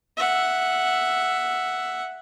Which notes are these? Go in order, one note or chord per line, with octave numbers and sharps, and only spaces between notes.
E5 F#5